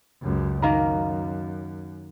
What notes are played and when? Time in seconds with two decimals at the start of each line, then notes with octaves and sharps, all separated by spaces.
0.22 C#2 F#2
0.62 F#2 D#3 A#3 A#4